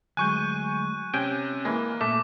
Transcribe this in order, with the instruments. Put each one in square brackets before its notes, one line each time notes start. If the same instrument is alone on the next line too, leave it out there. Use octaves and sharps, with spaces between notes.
[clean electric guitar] D2 F#3 G#3 [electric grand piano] G#5 C#6 G6 [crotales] F#6 D#7
[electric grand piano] C3 [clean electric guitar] C#4 [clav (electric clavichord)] G5 G#5
[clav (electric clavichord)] E3 G#3 [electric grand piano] A#3
[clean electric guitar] A#2 [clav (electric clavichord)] A3 [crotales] D6